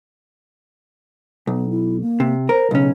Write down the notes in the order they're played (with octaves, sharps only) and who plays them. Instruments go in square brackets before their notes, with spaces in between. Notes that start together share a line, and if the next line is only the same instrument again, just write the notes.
[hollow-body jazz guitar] B1 [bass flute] B3
[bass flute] E4
A#3
[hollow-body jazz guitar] C3
[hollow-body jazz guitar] A#4 [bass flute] C5
[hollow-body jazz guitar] B1 C#4 [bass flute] C#3